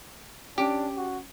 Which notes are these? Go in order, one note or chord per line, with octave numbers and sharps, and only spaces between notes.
C#4 D4 G4 D7
F#4